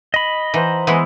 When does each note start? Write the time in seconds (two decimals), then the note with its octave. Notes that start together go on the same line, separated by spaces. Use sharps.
0.14 D#5 B5
0.54 E3 C5 F#5 A#5
0.87 E3 G#3 B3 E4